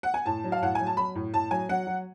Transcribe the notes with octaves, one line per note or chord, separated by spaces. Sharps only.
F#5
G#5
A2 A5
F#3
F5
A2 F#5
F#3 G#5
A5
F#3 B5
A2
A2 A5
F#3 G#5
F#3 F#5
F#3